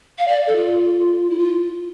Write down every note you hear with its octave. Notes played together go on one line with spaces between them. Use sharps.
F5
D5
A4
F4
E4
F4